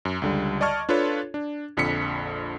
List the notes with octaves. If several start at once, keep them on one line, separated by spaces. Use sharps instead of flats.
F#2
C#2 D3 G3
D5 D#5 A5 C#6 F6 G#6
D4 F4 A4 B4 C#5
D4
A#1 F2 D3 B5 B6 C#7